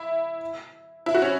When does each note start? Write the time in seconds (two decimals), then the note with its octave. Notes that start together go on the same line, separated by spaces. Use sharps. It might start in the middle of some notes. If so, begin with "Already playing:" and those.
Already playing: E4
1.06 E4
1.15 F#4
1.22 C#4